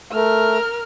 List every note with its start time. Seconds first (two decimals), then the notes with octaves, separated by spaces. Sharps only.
0.12 A3 A#4 F6